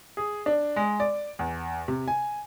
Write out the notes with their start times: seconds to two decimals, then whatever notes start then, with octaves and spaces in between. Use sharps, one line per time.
0.17 G#4
0.46 D4
0.76 G#3
1.00 D5
1.39 E2
1.88 C3
2.08 G#5